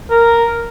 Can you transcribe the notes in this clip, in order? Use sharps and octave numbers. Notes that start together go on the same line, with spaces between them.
A#4